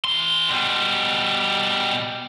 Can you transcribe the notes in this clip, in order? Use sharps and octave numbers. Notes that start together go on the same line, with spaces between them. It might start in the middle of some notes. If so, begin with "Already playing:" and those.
E3 C6
B2 G3